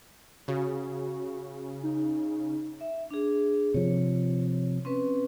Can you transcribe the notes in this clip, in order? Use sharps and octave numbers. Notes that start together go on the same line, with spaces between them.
C#3 F#4
D#4
E5
D4 G#4
C3 F3 C#5
C4 C#4 B4